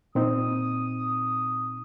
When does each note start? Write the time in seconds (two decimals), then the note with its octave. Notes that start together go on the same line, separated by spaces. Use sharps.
0.15 A#2 C4 D#4 D#6